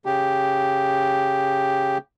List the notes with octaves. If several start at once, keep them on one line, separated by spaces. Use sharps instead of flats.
C#3 G4